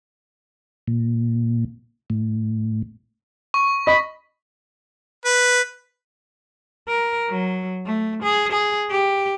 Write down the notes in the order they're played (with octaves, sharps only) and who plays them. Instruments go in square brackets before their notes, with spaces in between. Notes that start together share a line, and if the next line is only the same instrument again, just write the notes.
[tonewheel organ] A#2
A2
[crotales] C#6
[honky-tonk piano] D#5 [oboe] B5
[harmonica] B4
[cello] A#4
F#3
A3
G#4
G#4
G4